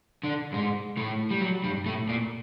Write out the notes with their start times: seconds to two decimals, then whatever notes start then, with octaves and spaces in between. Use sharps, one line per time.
0.23 D3 D4
0.52 G#2 G#3
0.97 A2 A3
1.31 G3
1.41 F#3
1.64 G2 G3
1.86 A2 A3
2.08 A#2 A#3